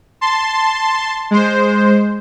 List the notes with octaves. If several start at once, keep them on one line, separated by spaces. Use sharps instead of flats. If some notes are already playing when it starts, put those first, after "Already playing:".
A5 C6
G#3 C5